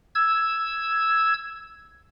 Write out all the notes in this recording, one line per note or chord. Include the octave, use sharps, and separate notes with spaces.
E6 G#6